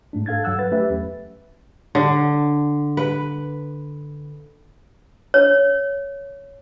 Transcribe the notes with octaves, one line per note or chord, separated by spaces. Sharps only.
G#2 A3 D4
A4 F5 G#6 A6
G2 F#3 F#5 E6 F#6
B4 A6
F#3 A3 C#4 G4 B4 E5
E2
D3
B4
C#5